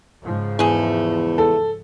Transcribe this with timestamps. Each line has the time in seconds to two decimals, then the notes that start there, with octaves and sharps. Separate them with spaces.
0.22 G#2 C#3 F3
0.59 E2 A3 G#4
1.38 A4